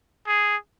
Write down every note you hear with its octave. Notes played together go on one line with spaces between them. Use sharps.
G#4